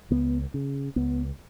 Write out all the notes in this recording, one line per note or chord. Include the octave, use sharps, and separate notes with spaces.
C#2 B3
C#3
C#2 B3